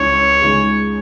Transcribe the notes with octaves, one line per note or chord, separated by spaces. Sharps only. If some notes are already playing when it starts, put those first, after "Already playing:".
Already playing: C#2 C#3 G#3 C#4 E4 C#5
C#3 G#3 D#4